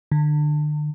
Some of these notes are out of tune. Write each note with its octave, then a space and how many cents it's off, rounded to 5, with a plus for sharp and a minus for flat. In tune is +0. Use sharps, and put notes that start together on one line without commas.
D3 +35